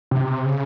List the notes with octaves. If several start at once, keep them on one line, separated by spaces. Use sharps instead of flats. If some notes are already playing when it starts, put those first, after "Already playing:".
C3
C#3